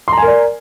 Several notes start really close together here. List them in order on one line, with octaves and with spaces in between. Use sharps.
C6 A#5 G#5 A#4 D5